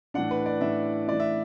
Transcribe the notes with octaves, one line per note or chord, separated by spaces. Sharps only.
A2 E3 D4 F#5
B4
D5
A2 E3 D4 E5
A2 E3 D4 D5
E5